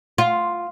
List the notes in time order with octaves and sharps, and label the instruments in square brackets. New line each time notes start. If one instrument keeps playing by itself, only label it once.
[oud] F4